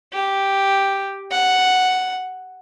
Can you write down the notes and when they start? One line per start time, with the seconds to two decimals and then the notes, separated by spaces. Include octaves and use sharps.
0.13 G4
1.31 F#5